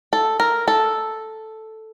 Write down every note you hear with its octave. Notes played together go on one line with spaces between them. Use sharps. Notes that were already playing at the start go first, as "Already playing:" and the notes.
A4
A#4
A4